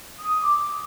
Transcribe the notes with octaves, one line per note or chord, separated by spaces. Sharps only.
D#6
D6